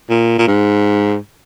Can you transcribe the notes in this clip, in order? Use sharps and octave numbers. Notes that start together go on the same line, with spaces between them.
A#2
A#2
G#2